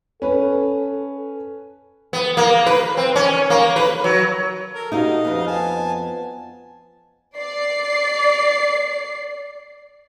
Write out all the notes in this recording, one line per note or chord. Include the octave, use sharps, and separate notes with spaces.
C#4 A4 B4
B3
A#3
B4
C4
C#4
A#3
B4
F#3
A4 A#4
D#4 F#4 A4 D#5 F5
F2 B3
G#5 A5
D5 C7